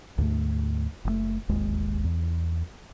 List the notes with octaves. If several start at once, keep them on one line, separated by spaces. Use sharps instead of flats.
D2 G#2 A3
F#1 D3 A3
D1 G#1 D#2 G#3
E2